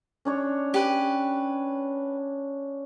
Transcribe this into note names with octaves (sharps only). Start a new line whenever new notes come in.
C#4 D4 C#5
G4 B4